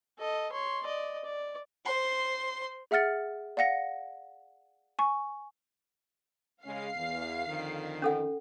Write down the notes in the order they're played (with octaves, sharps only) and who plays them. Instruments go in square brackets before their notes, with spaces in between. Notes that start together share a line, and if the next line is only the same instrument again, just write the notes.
[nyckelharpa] A4 D#5
C#5 C6
D5 D#5
D5
[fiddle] C5 C6
[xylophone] G#4 E5 F#5 F6 A6 C#7
D5 F5 F#5 A#6 C#7
G#5 C#6
[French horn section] C#3 G#3 C#4 [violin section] F5 C7
[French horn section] E2
F2 D3 D#3
[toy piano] C#4 A4 F#5